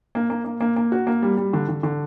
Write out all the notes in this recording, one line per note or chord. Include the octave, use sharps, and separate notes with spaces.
A#3
A#3
A#3
A#3
A#3
F#4
A#3
G3
G3
D3
D3
D3